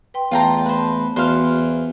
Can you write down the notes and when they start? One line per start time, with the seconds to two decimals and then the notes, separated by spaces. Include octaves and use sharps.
0.14 B4 G5 C6
0.31 E2 A3 F4 G5 A5 A#5 C6
0.66 B4 C5
1.16 E2 F#4 C5 F5